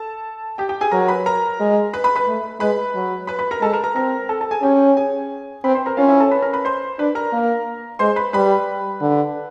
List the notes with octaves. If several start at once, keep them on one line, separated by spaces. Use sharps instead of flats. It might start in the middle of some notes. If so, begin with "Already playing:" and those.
Already playing: A4 A5
G4 G5
G4 G5
G#4 G#5
F#3 A#4 A#5
B4 B5
A#4 A#5
G#3
B4 B5
B4 B5
B4 B5
A3
G#3 B4 B5
F#3
B4 B5
B4 B5
A#4 A#5
G#3 A4 A5
A#4 A#5
A#4 A#5
C4 A#4 A#5
A4 A5
A4 A5
G#4 G#5
C#4 G4 G5
G#4 G#5
C4 B4 B5
C5 C6
A#4 A#5
C#4 F4 F5
E4 E5
A4 A5
B4 B5
A#4 A#5
B4 B5
C5 C6
D4 B4 B5
A#4 A#5
A#3
G#3 C5 C6
B4 B5
G3 B4 B5
D3